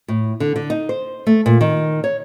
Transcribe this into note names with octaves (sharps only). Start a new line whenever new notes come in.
A2
D3
D3
D#4
C5
A3
A#2
D#3
C#5